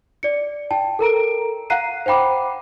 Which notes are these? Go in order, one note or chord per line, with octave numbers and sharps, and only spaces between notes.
D5 C#7
G5 A5
A4 A#4 A#5 D7
F5 F#5 A#5 F#6 C7 D#7
C5 F5 G5 B5 D6